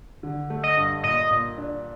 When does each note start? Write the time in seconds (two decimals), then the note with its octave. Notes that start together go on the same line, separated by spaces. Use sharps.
0.23 D3
0.50 A3
0.63 D#5
0.77 G2
1.03 A#2 D#5
1.31 A#2
1.58 D4